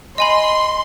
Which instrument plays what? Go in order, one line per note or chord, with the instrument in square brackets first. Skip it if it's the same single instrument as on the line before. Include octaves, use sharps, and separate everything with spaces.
[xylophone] D#5 G#5 B5 [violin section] C6